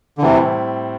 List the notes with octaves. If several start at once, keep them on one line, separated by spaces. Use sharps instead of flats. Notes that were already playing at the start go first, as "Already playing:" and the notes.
D3
A2 C3 E3 G3 C4 E4